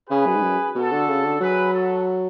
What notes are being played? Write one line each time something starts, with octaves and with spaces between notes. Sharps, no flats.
C#3 G#4 B4
F#2
G#2
F#2
B2 F#4 A4
D3
C#3
D3
F#3 G#4 B4
F#4 A4